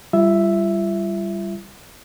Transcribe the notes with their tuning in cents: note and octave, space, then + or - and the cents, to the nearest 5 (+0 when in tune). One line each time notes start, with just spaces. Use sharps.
G3 +0 F4 -40 E5 +0